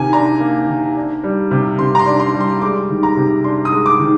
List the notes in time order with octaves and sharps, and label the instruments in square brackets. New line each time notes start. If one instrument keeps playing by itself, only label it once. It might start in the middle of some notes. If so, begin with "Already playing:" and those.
Already playing: [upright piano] C3 D#3 G#5
D4 A#5
A#3
D#3
D4
G3
C3
C3 C6
A#5
C6
D4
C6
G3
C6
G#3 D6
D#3
A#5
C3
D4 C6
D#6
G#3
D6
D#3